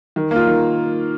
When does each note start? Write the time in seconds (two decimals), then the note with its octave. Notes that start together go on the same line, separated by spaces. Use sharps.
0.16 D#3
0.31 A#3 F4
0.47 D#3